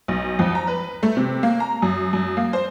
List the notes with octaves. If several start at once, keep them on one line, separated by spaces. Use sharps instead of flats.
B1
F2
A#5
B4
A3
C3
A#3
A#5
F#2
F#2
A#3
C5